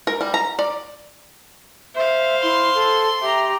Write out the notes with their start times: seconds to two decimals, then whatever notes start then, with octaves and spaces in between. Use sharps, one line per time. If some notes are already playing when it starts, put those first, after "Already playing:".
0.07 A#4
0.21 G3
0.34 A#5
0.59 D5
1.95 C5 E5 F5
2.43 E4 C6
2.74 A4
3.21 G4 E5 A#5